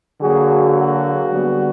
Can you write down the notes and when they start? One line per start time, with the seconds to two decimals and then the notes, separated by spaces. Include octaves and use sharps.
0.21 D3 F#3 A#3 F#4 G#4
0.75 F#4 G#4
1.30 D3 G3 B3